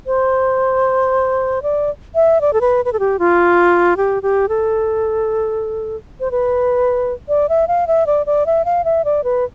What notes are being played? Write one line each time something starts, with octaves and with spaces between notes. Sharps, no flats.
C5
D5
E5
D5
A4
B4
B4
A4
G4
F4
G4
G4
A4
C5
B4
D5
E5
F5
E5
D5
D5
E5
F5
E5
D5
B4